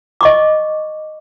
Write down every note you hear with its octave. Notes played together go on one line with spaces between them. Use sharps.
D#5 C#6 D6